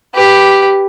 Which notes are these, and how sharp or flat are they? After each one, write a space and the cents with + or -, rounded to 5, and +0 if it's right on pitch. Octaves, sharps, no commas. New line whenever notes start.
G4 +0 B4 +0